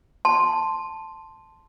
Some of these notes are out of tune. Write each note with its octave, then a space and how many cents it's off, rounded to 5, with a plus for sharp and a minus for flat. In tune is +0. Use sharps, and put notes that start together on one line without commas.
A5 +0 C6 +0